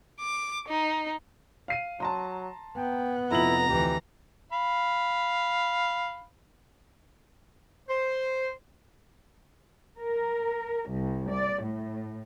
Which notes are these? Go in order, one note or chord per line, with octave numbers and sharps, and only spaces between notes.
D6
D#4
F5 C7 D#7
F#3 A5 A#5 C6
B3 G5
F1 E4 F4 A#5 F#7
D2 E3 G4
F5 B5
C5
A#4
C2
D5
A2